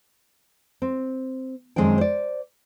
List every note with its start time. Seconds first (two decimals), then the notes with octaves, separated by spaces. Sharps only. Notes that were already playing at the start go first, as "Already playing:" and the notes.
0.82 C4
1.76 F#2 D#3 G#3 C4 D4 G5
1.98 C5 D5